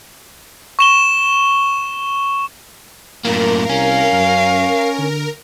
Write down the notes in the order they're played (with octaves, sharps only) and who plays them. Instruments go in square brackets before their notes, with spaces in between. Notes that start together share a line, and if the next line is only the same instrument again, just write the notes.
[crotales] C#6 E7 G7
[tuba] F#2 [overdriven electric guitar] A2 A#3 [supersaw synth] A#4
[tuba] C2 [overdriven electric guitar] C#4 [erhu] F5
[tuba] F#2
D3